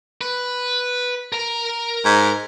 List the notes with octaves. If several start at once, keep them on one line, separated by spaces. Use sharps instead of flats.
B4
A#4 A#5
G#2